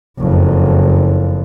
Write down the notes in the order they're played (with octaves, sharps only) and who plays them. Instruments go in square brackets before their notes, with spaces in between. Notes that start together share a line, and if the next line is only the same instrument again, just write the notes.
[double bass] F#1 F2